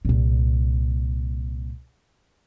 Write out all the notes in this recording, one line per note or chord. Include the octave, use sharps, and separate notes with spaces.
C2 A#2